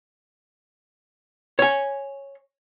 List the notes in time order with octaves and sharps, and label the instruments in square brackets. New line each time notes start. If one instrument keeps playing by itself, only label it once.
[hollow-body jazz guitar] C#5 G#5